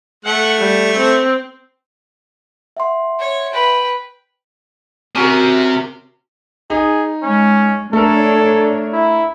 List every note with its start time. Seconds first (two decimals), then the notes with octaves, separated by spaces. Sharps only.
0.25 A3 F#5
0.59 G3
0.97 C4
2.77 E5 F#5 C6
3.19 C#5
3.51 B4 G5
5.15 C3 C#4 F#4 A#4
6.70 D#4 G#4
7.23 G#3 C#4
7.93 A3 D4 A4 A#4 C#5
8.93 E4